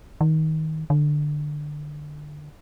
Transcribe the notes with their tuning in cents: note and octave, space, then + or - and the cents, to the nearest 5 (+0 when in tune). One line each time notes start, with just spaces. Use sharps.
D#3 +20
D3 +15